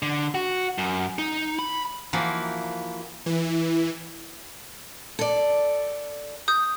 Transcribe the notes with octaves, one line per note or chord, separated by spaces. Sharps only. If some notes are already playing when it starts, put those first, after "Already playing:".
D3
F#4
F#2
D#4
B5
E3 F3 A#3 D#4 F#4
E3
A4 D5
D#6 G6